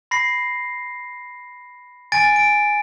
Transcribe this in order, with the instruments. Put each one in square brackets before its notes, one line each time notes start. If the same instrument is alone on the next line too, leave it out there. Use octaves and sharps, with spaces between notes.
[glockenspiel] B5 A#6 C7
G#5 A6 D7
D7